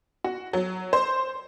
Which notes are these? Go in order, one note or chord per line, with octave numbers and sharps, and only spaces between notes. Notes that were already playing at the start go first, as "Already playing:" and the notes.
F#4
F#3
C5